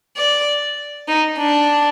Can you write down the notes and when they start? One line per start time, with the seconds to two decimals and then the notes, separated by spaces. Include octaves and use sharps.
0.17 D5
1.08 D#4
1.38 D4